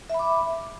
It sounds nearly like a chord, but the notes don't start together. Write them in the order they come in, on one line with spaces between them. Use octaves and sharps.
E5 B5 D6